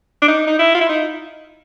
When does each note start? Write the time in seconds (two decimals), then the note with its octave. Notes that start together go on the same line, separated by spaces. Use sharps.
0.22 D4
0.28 D#4
0.47 D#4
0.59 E4
0.75 F4
0.81 E4
0.89 D#4